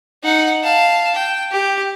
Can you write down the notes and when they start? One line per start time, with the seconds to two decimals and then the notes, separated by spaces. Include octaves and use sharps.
0.23 D#4 F#5
0.63 F5 A5
1.15 G5
1.52 G4